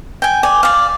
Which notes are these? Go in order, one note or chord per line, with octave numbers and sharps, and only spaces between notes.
G5 G#5
D5 G#5
D5 F5